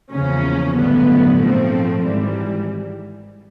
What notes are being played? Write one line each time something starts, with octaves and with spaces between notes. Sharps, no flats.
E2 C#3 F3 A#3 C#4
A1 G2 D3 F#3 B3
A#1 G#2 F3 A3 C4
G#1 G#2 E3 G3